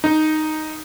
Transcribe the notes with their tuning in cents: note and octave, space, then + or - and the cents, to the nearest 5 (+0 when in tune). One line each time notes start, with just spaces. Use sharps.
D#4 -5